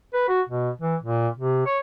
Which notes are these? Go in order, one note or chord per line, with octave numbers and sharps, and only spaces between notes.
B4
F#4
B2
E3
A#2
C3
C#5